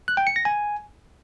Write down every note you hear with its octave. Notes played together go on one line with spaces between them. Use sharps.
F#6
G5
C#7
A#6
G#5